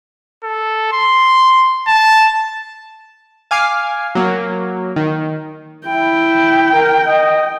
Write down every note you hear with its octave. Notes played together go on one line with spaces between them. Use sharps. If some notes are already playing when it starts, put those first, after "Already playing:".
A4
C6
A5
F5 G#5 D6 F6 C7
F#3 A#3
D#3
E4 G5
A#4
D#5